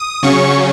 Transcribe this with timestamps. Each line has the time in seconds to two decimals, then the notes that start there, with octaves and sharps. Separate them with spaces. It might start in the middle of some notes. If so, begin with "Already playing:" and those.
Already playing: D#6
0.23 C#3 F#3 C#4 C#6